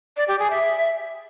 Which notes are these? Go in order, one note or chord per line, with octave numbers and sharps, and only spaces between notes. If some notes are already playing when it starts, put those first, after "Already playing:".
D5
G4
G#4
E5